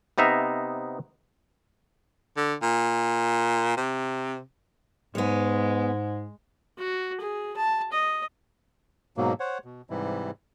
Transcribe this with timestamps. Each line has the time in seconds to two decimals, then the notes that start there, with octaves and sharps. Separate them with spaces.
0.18 C3 B3 D#4 E5 A#5
2.37 D3
2.62 A#2
3.77 C3
5.15 G#2 G#3 B3 C#5
6.78 F#4
7.20 G#4
7.57 A5
7.92 D#5
9.17 G#2 B2 F#3 A#3
9.40 C5 C#5 F#5
9.64 B2
9.90 G#2 C3 E3 G3 E4